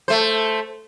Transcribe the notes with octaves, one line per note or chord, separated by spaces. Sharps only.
A3 C5